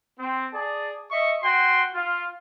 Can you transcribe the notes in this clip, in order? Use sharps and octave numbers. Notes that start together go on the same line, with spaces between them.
C4
G#4 D5 A5
D#5 E5 C#6
F#4 G5 C6
F4